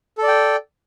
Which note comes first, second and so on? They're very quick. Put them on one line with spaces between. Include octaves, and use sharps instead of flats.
A4 D5 G5